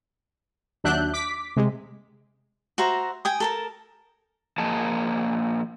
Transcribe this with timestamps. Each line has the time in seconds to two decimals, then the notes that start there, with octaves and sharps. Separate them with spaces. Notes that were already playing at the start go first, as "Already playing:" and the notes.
0.84 D#2 F#3 D4 E5 F#6 G6
1.13 D6 B6
1.56 C3 G#3
2.78 F#4 C5 E5 A#5
3.25 G5 G#5 D#6
3.40 A4 A#4 A5
4.58 F3 A#3 G#4 D#5 A5